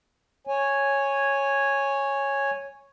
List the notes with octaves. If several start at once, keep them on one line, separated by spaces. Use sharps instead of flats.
C#5 G#5